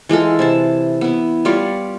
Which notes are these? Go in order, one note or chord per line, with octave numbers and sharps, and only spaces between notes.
E3 G#3 F4 A4
C3 E4 A5
B3 E4
G3 F4 C#5 D5